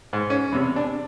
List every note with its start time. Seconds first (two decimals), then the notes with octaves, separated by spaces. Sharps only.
0.13 G#2
0.30 C#4
0.52 E2 C3
0.76 D4